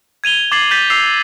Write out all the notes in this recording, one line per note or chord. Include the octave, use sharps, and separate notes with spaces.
G#6 D#7 F7 G7
D6 G#6 A6 C7 F#7
G6 A6 B6 D#7
D6 E6 C7 F7